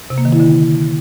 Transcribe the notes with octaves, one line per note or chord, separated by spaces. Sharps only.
C3
A#3
D#3
E4
D3